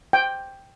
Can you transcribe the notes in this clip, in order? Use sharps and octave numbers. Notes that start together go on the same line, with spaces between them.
G5